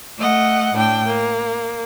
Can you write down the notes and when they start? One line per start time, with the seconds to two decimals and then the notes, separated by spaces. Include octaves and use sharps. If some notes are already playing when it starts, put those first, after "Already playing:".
0.19 A3 D#5 F#5
0.74 A2 D4 G5
1.07 A#3